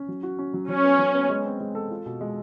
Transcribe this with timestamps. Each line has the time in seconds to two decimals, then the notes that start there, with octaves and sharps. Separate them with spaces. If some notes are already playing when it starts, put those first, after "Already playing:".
Already playing: C#4
0.08 F#3
0.23 F#4
0.39 C#4
0.54 F#3
0.69 F#3 C#4
0.84 B3
0.99 F#3
1.14 B3
1.30 G#3
1.45 C4
1.60 G#3
1.75 A4
1.90 F4
2.06 B2
2.21 G#3